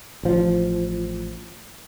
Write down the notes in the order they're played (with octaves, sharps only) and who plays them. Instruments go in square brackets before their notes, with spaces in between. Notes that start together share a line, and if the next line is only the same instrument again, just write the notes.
[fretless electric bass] A1 F3